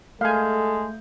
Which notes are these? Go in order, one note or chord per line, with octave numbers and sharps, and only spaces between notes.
G#3 A3 A4 F5 G#5 G6